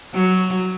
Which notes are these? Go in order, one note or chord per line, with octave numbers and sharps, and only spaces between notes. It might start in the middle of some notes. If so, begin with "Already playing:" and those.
F#3